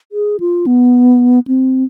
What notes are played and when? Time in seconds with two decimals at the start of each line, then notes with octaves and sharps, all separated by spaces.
0.12 G#4
0.40 F4
0.67 B3
1.48 C4